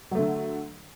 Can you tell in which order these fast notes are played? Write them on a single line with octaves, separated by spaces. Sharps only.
F#3 A3 D3